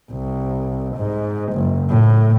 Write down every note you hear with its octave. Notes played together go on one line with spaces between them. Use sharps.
C2
G#2
F#1
A2